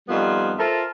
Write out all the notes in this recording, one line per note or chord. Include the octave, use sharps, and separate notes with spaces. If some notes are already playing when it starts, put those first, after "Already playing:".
F2 D#3 G3 B3 F4
F4 A4 A#4 C5 E5